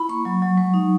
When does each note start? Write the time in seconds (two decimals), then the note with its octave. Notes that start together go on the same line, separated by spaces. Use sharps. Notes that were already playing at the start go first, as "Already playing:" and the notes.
Already playing: E4 B5
0.09 A#3 C#6
0.25 F#3
0.42 F#3
0.57 G#3
0.74 D#4